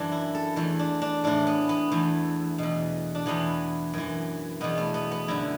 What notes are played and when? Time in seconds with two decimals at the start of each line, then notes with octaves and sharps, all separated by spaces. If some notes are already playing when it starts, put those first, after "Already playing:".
Already playing: F#2 E3 D4
0.12 E4
0.35 A4
0.56 E2 E3 A3
0.79 D4
1.02 D4
1.24 A2 E3 D4
1.47 B3
1.69 B3
1.92 E2 E3 A3
2.58 E2 B2
3.15 D4
3.26 E2 E3 B3
3.94 F#2 E3
4.61 E2 B2 B3
4.78 A3
4.94 B3
5.11 B3
5.28 F#2 D3 E4